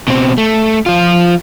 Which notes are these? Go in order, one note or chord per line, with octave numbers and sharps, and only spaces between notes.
B2 C4
A3
F3 F4